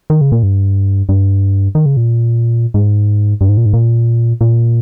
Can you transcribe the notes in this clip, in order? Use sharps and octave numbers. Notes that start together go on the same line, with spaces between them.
D#3
C#3
A#2
G2
G2
D#3
C#3
A#2
G#2
G2
G#2
A#2
G#2
A#2
A#2